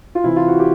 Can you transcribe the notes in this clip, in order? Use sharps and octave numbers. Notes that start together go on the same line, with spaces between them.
F4
C3 E3 E4
F4
F#4
G4